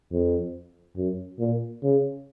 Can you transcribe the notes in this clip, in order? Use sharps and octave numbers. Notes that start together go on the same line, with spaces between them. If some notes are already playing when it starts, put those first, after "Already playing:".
F2
F#2
A#2
C#3